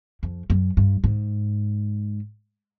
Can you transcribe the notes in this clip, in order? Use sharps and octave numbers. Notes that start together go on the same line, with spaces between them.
F2
F#2
G2
G#2